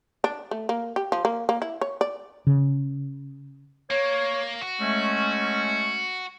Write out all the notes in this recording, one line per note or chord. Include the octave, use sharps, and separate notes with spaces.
D4
A3
A#3
G4
F3
A#3
A#3
E4
C#5
D5
C#3
A#3 C#5
F#4
G#3 A3 C#4